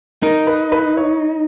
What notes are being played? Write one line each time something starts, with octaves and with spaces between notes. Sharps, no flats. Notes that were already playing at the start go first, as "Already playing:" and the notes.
D#4 A#4
B4
B4
C#5